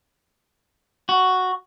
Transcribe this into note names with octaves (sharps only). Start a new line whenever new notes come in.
F#4